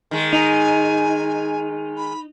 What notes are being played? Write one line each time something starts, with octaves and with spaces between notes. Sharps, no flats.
D#3 G#3
D#4 G#5
B5